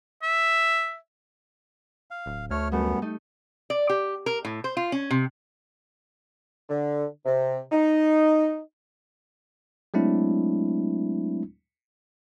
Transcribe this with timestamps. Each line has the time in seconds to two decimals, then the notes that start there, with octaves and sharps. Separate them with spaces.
0.23 E5
2.11 F5
2.26 D1
2.51 D2 A3 C#5 F6
2.72 F#2 G3 A3 B3
3.02 A3 D#4
3.70 D5
3.89 G4
4.26 A#4
4.45 A2
4.64 C5
4.77 F4
4.92 C#4
5.10 C3
6.69 D3
7.25 C3
7.72 D#4
9.94 F#3 G#3 A3 C4 D4 E4